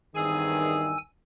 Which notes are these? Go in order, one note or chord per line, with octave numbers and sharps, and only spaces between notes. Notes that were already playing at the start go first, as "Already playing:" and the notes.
E2 G2 D#3 C4 G#4 G#5 E6